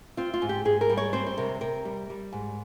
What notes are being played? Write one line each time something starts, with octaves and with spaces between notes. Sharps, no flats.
C4 F4
F4
G#2
G4
G#2 G#4
A#4
G3
C#5
C4 C5
C5
C3 A#4
C3 A#4
G3
G3
G#2